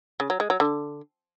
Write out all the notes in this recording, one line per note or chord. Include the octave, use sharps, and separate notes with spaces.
C#3
F#3
G#3
F#3
D3